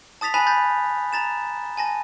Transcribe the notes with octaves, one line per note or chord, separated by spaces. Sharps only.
A5 D#6 A6 B6 F7
G#5 A5 B5 F#6 B6 F7
B5 G6 A6
A#5 A6 E7
G#5 A5 A#6